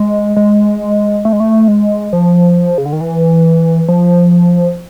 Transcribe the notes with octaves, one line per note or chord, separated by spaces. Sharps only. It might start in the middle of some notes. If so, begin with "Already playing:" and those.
Already playing: G#3
G#3
A3
G#3
A3
G#3
F3
C#3
D3
D#3
E3
F3